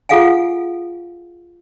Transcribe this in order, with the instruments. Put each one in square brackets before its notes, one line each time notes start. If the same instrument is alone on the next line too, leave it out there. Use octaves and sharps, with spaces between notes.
[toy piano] F4 G#4 A4 F5 F#5 G#5